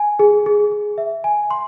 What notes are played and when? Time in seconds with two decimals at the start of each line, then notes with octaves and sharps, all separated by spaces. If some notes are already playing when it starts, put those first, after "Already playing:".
Already playing: G#5
0.19 G#4
0.46 G#4
0.72 G#4
0.98 E5
1.24 G#5
1.51 C6